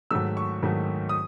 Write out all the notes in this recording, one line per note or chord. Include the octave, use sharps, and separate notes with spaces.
G#2 D#3 F#3 A3 E6
C#6
G#2 D#3 F#3 A3
D#6